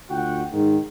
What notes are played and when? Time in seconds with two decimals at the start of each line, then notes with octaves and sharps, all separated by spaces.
0.10 D2 F4 F#4 F#5 G5
0.53 G#2 D#3